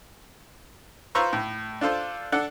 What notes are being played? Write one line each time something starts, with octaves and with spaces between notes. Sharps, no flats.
F4 B4 C5 A#5 C#6 E6
A2
D4 F4 A4 C5
D4 A4 F#5